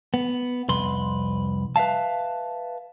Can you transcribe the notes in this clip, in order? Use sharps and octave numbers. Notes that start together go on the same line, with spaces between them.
B3
C2 F2 B4 C6
B4 E5 F5 A5